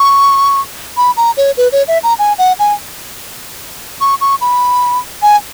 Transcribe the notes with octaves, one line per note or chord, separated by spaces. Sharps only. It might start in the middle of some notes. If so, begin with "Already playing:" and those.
Already playing: C#6
B5
A#5
C#5
B4
C#5
E5
A#5
G#5
F#5
G#5
C#6
C#6
B5
G#5